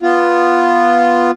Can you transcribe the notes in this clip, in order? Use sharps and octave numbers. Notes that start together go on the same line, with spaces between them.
B3 F4